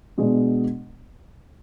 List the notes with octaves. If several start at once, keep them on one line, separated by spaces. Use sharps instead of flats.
B2 G#3 D4